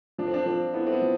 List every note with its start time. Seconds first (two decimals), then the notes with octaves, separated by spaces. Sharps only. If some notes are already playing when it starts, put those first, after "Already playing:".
0.18 F3 D4
0.27 C4
0.34 D4
0.46 F3 C4
0.74 B3 E4
0.87 C4
0.92 B3
1.01 F3